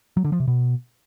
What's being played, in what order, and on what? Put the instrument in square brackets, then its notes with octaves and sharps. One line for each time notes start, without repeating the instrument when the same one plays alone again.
[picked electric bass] F#3
D3
F3
C3
B2